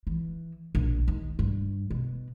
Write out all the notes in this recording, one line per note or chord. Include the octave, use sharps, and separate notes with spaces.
E3
A#1
D#2
G2
B2